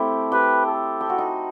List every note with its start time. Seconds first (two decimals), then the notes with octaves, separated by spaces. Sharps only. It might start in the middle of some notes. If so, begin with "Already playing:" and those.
Already playing: A3 C4 E4 G4
0.32 G4 B4
0.66 A4
1.01 G4
1.09 F#4
1.18 D#4